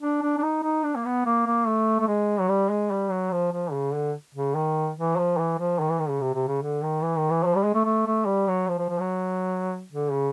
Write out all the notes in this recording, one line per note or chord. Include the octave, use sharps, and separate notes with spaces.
D4
D4
D4
D#4
D#4
D4
A#3
B3
A#3
A#3
A3
A3
G#3
F#3
G3
G#3
G3
F#3
F3
F3
C#3
D3
C#3
D#3
E3
F3
E3
F3
D#3
E3
D#3
C#3
C3
C3
C#3
D3
D#3
E3
D#3
E3
F3
G3
G#3
A3
A3
A3
G3
F#3
F3
F3
F3
F#3
D3
C#3